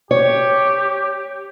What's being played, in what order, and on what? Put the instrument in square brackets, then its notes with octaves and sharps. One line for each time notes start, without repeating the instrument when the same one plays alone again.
[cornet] G4 [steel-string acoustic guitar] C#5